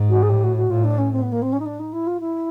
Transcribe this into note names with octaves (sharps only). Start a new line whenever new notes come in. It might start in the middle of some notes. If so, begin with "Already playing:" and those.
Already playing: G#2
F#4
G#4
A2 G4
F#4
F#4
A2 F4
D4
C#4
C4
B3
A#3
C4
C#4
D#4
D4
D#4
E4
F4
E4